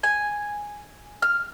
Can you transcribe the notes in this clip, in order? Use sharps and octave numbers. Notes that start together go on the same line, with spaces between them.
G#5
F6